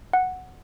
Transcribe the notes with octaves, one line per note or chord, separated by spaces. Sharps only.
F#5